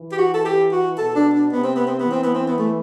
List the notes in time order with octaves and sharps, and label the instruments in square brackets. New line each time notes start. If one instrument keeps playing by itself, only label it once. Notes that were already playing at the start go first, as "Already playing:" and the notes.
Already playing: [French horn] E3
[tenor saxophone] G4
F#4
A4
G4
F#4
[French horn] B2 [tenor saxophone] A4
[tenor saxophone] D4
D4
[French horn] C3 [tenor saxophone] B3
[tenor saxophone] C4
B3
C4
B3
[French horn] E3
[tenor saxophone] C4
B3
C4
B3
A3